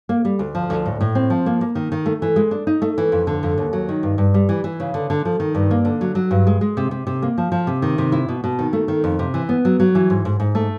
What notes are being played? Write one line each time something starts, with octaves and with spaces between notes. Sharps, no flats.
A#3
G3
D2
F3
D2
A2
A2
C4
F3
A#3
A#3
D#3
D#3
A3
E3
G#3
D4
D#4
A3
E3
F2
D3
F2
D#2
F#3
D#3
G2
G2
G3
E3
E3
C#3
D3
D3
F3
D#3
G2
A#3
D3
F#3
F#3
G2
G#3
G#3
C3
C3
C3
A#3
F3
F3
C3
D#3
C3
E4
B2
B2
D#3
A3
D#3
F2
C3
E3
B3
F#3
F#3
E3
G#2
G#2
G#2
A3